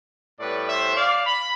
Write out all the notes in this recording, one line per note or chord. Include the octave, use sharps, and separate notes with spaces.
A2 G3 B3 B4 D5
C5 E5
D5 F5
B5